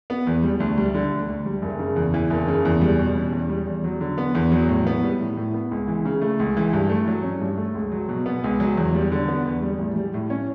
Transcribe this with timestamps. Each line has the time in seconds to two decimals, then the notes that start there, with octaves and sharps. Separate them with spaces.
0.10 B3
0.27 E2
0.44 G3
0.60 D2
0.78 G3
0.94 D3
1.12 D2
1.29 D2
1.46 G3
1.62 F#1
1.79 C#3
1.96 E2
2.14 E3
2.30 F#1
2.48 C#3
2.65 E2
2.82 G3
2.99 B2
3.16 C#4
3.33 E2
3.49 G3
3.67 E2
3.84 F#3
4.01 D3
4.18 B3
4.35 E2
4.52 F#3
4.69 A2
4.87 B3
5.03 G3
5.20 A2
5.37 A2
5.54 B3
5.71 C#2
5.88 E3
6.06 C#3
6.21 A3
6.40 C#2
6.57 E3
6.73 G2
6.90 A3
7.08 F#3
7.24 C#4
7.41 G2
7.58 A3
7.75 C#2
7.92 F#3
8.09 B2
8.26 B3
8.44 C#2
8.60 F#3
8.77 E2
8.95 G3
9.12 D3
9.28 B3
9.46 E2
9.62 G3
9.79 A1
9.96 G3
10.14 A2
10.30 C#4